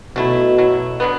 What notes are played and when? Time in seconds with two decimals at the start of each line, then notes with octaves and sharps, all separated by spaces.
0.16 B2 F#3 A3 E4
0.58 F#3 A3 E4
1.00 D3 F#3 B3